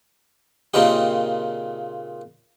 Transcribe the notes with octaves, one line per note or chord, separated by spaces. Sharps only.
A#2 C#3 A#3 C4 D#4 G4